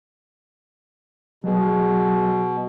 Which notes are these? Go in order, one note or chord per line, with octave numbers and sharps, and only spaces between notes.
B2 F#3 G#4